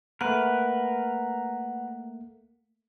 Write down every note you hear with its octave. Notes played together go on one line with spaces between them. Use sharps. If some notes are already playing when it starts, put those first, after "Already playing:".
A3 A#3 A#4 B4 F#5